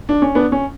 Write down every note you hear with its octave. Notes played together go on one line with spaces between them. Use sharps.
D4
C#4
B3 D4
C#4